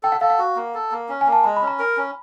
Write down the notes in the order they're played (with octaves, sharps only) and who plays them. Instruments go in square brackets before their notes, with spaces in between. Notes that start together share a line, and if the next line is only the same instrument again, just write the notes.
[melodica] A4 [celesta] G5
[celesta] F#5
[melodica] A4 [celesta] F5
[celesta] F#5
[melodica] F#4
A#3
A4
A#3
C#4
[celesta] G#5
[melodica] A#3
[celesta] A5
[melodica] G#3 [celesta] A#5
[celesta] B5
[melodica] C#4
[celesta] A#5
[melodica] A#4
C#4